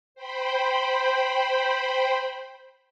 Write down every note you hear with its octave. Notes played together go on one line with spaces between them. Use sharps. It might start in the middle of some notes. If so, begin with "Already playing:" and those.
C5 G5 B5